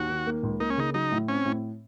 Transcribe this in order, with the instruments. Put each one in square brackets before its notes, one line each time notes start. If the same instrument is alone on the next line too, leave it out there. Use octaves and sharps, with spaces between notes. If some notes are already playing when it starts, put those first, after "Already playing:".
Already playing: [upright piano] D#2 [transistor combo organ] F#4
[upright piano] D#3
A#3
C#2
[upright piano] A#3 [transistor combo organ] D#4
[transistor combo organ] C#4
[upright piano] C#3 [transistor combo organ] D#4
[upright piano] F#3 [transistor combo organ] D#4
[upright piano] A2
[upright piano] C4 [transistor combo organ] C#4
[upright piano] A2